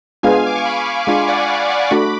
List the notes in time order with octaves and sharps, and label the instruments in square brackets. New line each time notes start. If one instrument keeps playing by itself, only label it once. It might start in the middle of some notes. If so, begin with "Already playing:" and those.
[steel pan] G#3 B3 D4 F4 G#4 [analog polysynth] F5 G#5
[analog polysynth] D6
C#6
G#5 B5
[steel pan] G#3 D4 F4 [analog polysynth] F5 G#5
[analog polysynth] D5 F#5
F5
D5 F#5
[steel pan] A3 D4 F#4 [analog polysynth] B5 D6